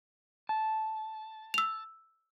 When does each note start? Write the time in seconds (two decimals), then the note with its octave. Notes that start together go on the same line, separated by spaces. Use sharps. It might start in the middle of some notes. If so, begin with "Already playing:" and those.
0.49 A5
1.54 E6 F7